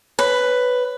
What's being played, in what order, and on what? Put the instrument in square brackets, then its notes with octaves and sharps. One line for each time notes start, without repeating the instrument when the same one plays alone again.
[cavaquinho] B4 [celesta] C#5